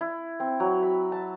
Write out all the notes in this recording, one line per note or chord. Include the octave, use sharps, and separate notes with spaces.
E4
C4
F#3
B5
A5